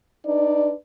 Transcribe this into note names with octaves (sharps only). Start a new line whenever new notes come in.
D4 D#4 B4 D5